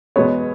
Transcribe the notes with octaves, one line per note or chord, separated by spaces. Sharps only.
E2 B2 G#3 B3 C#5